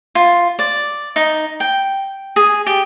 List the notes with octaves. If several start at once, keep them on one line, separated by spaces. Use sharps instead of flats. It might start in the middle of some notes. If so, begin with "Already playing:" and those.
F4
D5
D#4
G5
G#4
G4